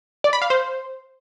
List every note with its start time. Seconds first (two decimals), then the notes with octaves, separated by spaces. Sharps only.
0.24 D5
0.33 B5
0.42 F5
0.50 C5